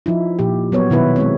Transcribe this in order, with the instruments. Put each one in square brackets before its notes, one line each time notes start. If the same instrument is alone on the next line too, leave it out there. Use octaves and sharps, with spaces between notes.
[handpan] F3 D#4 E4
A#2 F3 G4
F#3 B3 C#5
B2 D#3 E4 B4
G#3 C4 C#5